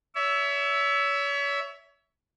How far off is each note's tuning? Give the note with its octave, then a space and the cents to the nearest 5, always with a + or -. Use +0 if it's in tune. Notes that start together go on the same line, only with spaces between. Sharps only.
C#5 +35 E5 +0